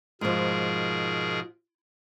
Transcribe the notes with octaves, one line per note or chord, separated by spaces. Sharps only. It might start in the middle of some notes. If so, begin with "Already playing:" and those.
G#2 B2 F3 G#4 A#4